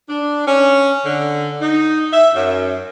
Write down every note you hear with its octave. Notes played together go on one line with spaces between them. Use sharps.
D4
C#4
D3
D#4
E5
F#2